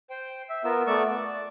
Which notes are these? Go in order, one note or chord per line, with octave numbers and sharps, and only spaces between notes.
C5 G5
E5
B3 F4 A#4 E6
A3 B3 D5 C#6 E6
D5